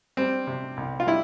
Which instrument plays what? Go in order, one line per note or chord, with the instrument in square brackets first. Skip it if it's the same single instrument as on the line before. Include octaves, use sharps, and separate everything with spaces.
[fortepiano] G3 C4
C3
C2
F4
G3 E4